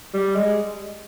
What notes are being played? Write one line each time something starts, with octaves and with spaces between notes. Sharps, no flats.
G3
G#3